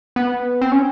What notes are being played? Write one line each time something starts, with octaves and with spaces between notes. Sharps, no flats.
B3
C4
C#4